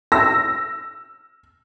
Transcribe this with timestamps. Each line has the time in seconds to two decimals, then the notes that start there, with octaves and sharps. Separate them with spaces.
0.12 E6 A#6